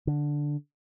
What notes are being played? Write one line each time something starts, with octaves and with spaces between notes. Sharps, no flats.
D3